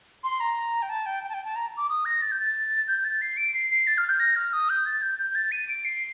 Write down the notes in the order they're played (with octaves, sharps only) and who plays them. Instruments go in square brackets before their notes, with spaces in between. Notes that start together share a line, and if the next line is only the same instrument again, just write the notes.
[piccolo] C6
A#5
G5
A5
G5
G5
A5
G5
A5
A#5
D6
D#6
A#6
A6
G6
A6
G6
A6
C7
D7
C7
C7
A6
F6
G6
A#6
F6
D#6
G6
A6
G6
G6
A6
D#7
D7
C7